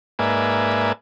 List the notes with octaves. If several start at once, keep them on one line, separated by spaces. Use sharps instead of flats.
G#2 A#3 B4 D5 E5 G#5